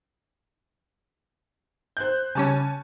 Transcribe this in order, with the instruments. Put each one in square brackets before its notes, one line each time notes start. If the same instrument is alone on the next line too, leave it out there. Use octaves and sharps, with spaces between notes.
[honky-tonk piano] C5 F#6 G6
[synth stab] C#3 G3 C#4 [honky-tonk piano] G#5 A5 C#6